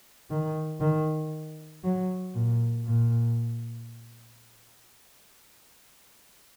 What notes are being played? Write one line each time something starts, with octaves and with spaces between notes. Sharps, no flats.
D#3
D#3
F#3
A#2
A#2